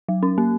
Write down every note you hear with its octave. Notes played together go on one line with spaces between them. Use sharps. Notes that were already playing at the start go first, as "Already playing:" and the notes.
F#3
C#4
A#3